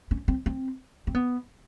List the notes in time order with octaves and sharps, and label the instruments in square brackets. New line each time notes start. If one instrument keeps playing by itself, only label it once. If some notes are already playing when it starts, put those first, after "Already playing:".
[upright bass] C#4
C4
C4
C4
B3